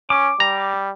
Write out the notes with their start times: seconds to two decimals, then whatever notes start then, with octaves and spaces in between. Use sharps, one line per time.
0.10 C#4 D6
0.40 G3 A#5